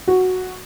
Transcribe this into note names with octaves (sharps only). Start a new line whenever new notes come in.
F#4